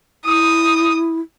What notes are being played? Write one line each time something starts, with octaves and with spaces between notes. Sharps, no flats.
E4 D#6